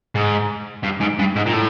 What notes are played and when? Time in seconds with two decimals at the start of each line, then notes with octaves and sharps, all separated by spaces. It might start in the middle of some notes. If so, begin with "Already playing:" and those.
0.15 G#2
0.84 G2
1.01 G#2
1.19 G2
1.36 G#2
1.46 A#2
1.53 A2